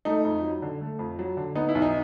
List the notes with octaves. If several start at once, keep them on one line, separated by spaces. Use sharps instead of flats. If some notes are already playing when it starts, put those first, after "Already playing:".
A3 D#4
F2
F#3
D3
A3
F2
F#3
D3
B3 D#4
E4
B1
D#4